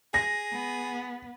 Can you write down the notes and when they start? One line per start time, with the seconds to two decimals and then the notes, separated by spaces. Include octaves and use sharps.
0.14 G#4 A#6
0.53 B3